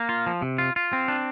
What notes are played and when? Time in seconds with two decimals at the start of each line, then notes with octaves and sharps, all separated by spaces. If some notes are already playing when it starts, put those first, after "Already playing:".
Already playing: A#3
0.09 F4
0.26 F3
0.42 C3
0.58 F4
0.76 F4
0.93 C4
1.08 D4